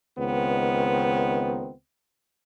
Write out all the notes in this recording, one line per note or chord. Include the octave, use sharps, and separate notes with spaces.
C#2 D#3 B3 C4